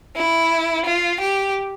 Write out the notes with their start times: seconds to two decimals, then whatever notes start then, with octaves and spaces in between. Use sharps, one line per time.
0.17 E4
0.86 F4
1.21 G4